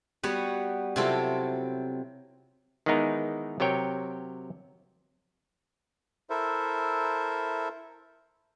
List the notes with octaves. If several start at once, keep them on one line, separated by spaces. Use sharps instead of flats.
G3 B3 F#4 C#5
C3 F#3 C4 E4 F4 A4
D#3 E3 G#3 B3 D#4 A#4
C3 F#3 A#4 C#5 G5
E4 A4 A#4 C5 E5